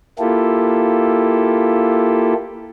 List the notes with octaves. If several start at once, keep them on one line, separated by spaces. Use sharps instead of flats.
A#3 E4 F4 G4 A4